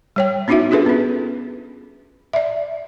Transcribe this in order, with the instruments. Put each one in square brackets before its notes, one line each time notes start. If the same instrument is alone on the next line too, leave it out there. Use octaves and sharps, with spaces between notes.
[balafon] G3 C#5 G5
B3 C#4 D#4 E4 F#4 E5
D4 F4 G#4 A4 B4
B3 C#4
D5 E5